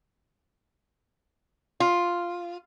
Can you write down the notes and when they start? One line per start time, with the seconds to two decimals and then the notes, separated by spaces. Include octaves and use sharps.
1.80 F4